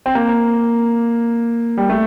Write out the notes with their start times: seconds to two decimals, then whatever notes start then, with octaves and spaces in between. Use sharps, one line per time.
0.06 C4
0.15 A#3
1.77 G3
1.90 A3